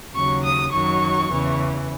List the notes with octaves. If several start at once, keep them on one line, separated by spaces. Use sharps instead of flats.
D#2 C#3 F#3 C#6
D#6
F#2 D#3 F#3 C#6
E2 C#3 E3